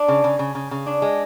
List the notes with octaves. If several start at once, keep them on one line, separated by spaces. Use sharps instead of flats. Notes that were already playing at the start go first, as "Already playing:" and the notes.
Already playing: D4
C#3
C#3
C#3
C#3
C#3
D4
G#3